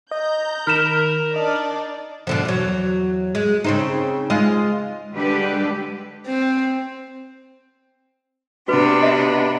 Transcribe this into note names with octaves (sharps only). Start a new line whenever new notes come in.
D#5 A#5 G6
D#3 A#4 B5 F6 B6 E7
D4 D#4 D5 D#5
B2 D3 F3
E2 F#3
G#3
C#3 C4 D#4
G#3 F4 D#5
D3 G3 G#3 D4 G4 B4
C4
C3 B3 D4 F#4 B4
D#5 E5